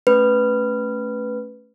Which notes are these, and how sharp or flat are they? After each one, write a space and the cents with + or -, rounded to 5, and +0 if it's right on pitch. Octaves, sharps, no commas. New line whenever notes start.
A3 +0 C#4 +0 B4 +0